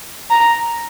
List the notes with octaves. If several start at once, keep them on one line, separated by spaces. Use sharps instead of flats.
A#5